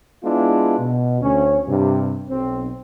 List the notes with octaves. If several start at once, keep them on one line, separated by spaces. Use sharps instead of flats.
G#3 B3 D4 E4 F4
B2
D2 C#4
G2 C3
B1 C4